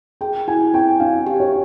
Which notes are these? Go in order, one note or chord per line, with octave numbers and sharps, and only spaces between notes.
G#4 G5
E4 G#5
C4 G5
D4 F5
G4
C#5